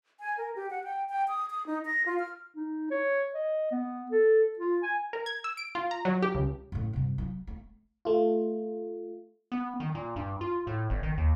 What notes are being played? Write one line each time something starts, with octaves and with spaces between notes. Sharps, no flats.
G#5
A#4
G4
F#5
G5
G5
D#6
D#6
D#4
A#6
F4
F6
D#4
C#5
D#5
B3
A4
F4
G#5
A#4
G#6
E6
D7
F4
A#5
F#3
G4
C#2
F#2 A2
G2 C3
E3 F#3
A3
A3 F4
B3
D#3
A#2
G2
F4
A2
G1
D#3
D#2